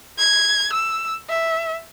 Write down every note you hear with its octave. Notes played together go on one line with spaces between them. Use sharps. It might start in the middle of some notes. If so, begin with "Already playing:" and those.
G#6
E6
E5